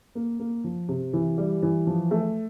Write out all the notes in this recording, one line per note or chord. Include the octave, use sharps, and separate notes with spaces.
A#3
A#3
F3
C3
E3
G3
E3
F3
A3